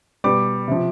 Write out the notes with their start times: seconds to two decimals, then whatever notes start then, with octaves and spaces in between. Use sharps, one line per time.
0.24 B2 G3 D6
0.68 C3 F3